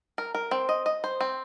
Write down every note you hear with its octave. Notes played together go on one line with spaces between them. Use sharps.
A#4
A#4
C4
D#5
D#5
C5
C4